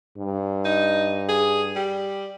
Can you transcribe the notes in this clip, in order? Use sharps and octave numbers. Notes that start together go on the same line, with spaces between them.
G2
D#4
G#4
G3